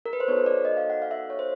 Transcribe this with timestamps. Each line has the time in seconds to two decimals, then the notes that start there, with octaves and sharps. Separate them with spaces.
0.06 A#4
0.13 B4
0.20 C5
0.28 B3 D#4 F#4 A4 C#5
0.46 D5
0.65 D#5
0.77 F5
0.90 F#5
1.02 F5
1.11 E5
1.30 C#5
1.39 C5